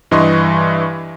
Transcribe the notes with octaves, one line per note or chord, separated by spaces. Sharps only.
G2 E3 D#5 C6 C#6